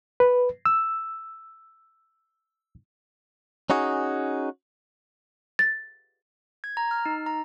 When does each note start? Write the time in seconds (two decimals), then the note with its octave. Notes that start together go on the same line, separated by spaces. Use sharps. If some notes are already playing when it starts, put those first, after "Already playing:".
0.20 B4
0.66 E6
3.70 C#4 D#4 F#4 G#4
5.59 A6
6.64 G#6
6.77 A#5
6.91 F6
7.06 D#4
7.26 A#5